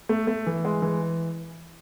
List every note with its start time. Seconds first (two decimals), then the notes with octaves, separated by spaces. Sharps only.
0.09 A3
0.27 A3
0.46 E3
0.65 G#3
0.82 E3